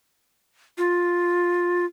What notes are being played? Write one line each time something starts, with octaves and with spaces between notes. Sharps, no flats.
F4